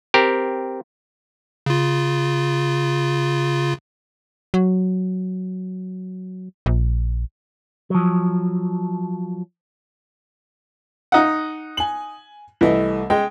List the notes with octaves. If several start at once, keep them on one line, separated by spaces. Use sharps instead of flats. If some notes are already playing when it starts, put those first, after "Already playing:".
C4 G4 A#4
C#3 F4
F#3
A#1
F3 F#3
D#4 F#5
G#5 F#7
C2 E3 A3 D#5
G#3 G5